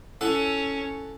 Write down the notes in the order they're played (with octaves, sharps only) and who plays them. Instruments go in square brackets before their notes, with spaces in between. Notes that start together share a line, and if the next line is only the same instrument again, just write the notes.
[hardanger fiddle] C#4 [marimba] E4 [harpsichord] A4 F#5